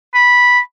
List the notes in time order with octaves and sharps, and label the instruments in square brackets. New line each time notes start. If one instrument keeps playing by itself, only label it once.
[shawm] B5